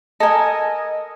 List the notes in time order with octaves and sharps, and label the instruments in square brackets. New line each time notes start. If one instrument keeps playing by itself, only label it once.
[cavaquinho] A4 A#4 [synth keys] D#5 G#5